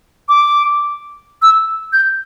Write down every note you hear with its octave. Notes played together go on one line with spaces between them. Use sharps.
D6
E6
G6